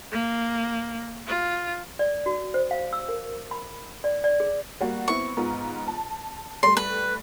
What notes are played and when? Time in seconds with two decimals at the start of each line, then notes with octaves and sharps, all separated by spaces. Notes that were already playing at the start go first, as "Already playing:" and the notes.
0.12 A#3
1.27 F4
1.99 D5
2.26 F#4
2.54 C5
2.71 F5
2.93 E6
3.09 A#4
3.51 B5
4.04 D5
4.24 D5
4.40 G#4
4.81 G3 A#3 F#4
5.08 B3 C4 E4 C#6
5.37 G#2 B3 F4
5.88 A5
6.63 G3 A3 C6
6.77 B4